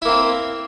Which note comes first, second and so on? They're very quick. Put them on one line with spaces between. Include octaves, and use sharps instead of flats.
E4 A#3 C4